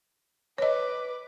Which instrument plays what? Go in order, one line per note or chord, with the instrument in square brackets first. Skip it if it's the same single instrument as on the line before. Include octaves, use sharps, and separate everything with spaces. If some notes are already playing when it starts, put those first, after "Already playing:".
[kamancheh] B4 D6 [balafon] C#5 D#5